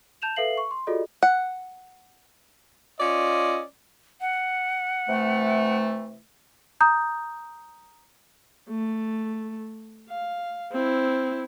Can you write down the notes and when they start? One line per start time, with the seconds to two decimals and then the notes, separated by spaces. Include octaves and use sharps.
0.22 A5 G6 E7 F7
0.36 A4 B4 E5 F5 C7 F#7
0.57 C#6
0.71 C6
0.87 F4 F#4 G#4 A4 D5 D#5
1.23 F#5
3.00 C#4 F4 D5 D#5
4.21 F#5
5.08 C3 E3 A3
6.81 A#5 D#6 G6
8.69 A3
10.09 F5
10.72 C4 E4